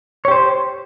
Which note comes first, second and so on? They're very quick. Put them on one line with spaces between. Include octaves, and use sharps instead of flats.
C#5 G4 C5